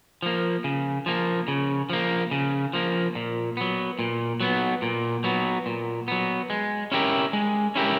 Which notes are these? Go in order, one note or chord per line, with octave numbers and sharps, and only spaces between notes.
F3 A#3
C#3
F3 A#3
C#3
F3 A#3
C#3
F3 A#3
A#2
F#3 B3
A#2
F#3 B3
A#2
F#3 B3
A#2
F#3 B3
G#3
C#4 E4 G4 A#4
G#3
C#4 E4 G4 A#4